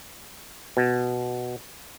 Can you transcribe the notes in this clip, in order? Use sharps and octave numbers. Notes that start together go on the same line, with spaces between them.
B2